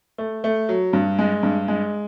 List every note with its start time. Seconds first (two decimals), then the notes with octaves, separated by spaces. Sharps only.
0.18 A3
0.44 A3
0.69 F#3
0.93 G2
1.19 G#3
1.43 G2
1.68 G#3